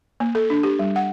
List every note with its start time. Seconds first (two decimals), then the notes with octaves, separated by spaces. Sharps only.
0.20 A#3
0.35 A4
0.50 D4
0.63 G4
0.79 G3
0.96 F#5